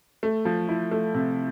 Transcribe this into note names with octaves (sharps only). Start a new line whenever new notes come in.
A3
F3
E4
A3
C3